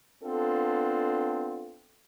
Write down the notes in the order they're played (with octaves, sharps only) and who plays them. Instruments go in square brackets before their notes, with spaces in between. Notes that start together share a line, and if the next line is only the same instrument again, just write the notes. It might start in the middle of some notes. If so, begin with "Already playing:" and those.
[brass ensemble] B3 C4 D4 F4 A4